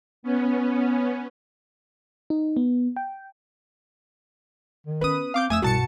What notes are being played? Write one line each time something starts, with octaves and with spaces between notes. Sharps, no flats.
B3 C#4
D#4
B3
G5
D#3
B3 C#4 B4 D#6
C4 F5 D6 G6
F2 A3 G#5 D#6 E6
C2 G2 B2 F#4 A5 C#7